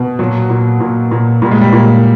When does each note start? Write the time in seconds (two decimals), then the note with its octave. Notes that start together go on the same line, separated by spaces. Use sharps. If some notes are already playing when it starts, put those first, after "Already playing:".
Already playing: B2
0.19 A#2 F#3
0.50 A#2
0.80 A#2
1.11 A#2
1.42 A#2 G3
1.51 G#3
1.61 G3
1.73 A#2